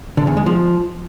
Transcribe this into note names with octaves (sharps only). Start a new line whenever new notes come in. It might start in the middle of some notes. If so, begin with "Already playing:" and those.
D3
E2
G#3
F3